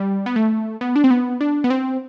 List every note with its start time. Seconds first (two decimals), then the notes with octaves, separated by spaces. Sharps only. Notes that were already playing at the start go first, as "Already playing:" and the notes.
Already playing: G3
0.26 B3
0.36 A3
0.81 B3
0.96 D4
1.04 C4
1.11 B3
1.41 D4
1.64 B3
1.70 C4